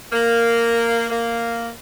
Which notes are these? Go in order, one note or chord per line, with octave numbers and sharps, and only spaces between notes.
A#3
A#3